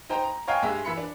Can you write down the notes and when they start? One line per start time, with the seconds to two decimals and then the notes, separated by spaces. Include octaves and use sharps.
0.09 D#4 C5 G5 A#5
0.24 A#5
0.48 C#5 D#5 F5 G5 G#5
0.63 G2 G#3 E5
0.85 E3 E5 B5 C#7
0.97 D4